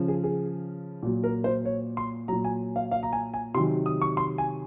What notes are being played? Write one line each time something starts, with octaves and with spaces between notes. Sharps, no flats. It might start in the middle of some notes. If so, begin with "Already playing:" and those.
Already playing: C#3 F3
G#4
G#4
A#2 F#3
A#4
C5
C#5
C6
A#2 F#3 A#5
G#5
F5
F5
A#5
G#5
G#5
C3 D#3 F#3 C6
D#6
C#6
C6
G#5